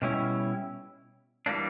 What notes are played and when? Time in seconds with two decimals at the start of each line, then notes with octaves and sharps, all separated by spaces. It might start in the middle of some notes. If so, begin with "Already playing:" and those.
0.02 B2 G3 C#4 E4
1.46 E3 G3 A#3 D4